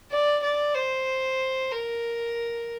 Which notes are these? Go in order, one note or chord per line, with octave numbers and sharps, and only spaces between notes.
D5
D5
C5
A#4